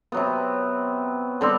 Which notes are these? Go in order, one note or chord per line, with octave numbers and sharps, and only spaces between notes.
C3 F#3 B3
D3 G3 C4